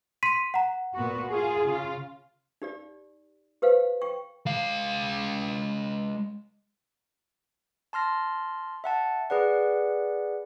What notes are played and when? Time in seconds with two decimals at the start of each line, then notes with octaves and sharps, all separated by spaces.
0.23 C6 B6 D#7
0.54 F#5 A#5
0.95 A#2 B3 F#4
1.30 F4 G#4
1.63 C#3 F4
2.62 D#4 G4 D5
3.62 G4 B4 C5 F5
4.01 G5 C#6
4.47 G#3 F5
7.93 A5 C6 F6 A#6
8.84 E5 F#5 A5
9.30 G#4 B4 D5 F#5